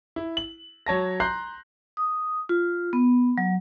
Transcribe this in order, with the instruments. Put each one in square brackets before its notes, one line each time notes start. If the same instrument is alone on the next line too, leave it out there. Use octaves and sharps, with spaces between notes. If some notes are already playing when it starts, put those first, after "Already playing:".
[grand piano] E4
F#7
F#3 C#5 A5 A#6
A#5 C6 F#6 G6 C7
[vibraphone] D#6
F4
B3
F#3